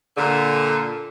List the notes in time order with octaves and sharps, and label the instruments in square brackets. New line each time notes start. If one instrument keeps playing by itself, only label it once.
[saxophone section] A#2 D3